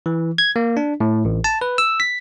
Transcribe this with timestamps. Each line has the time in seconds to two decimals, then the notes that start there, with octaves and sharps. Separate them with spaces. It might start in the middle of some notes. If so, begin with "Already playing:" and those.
0.06 E3
0.38 G#6
0.56 A#3
0.77 D4
1.00 A2
1.25 A1
1.44 A5
1.61 B4
1.78 E6
2.00 B6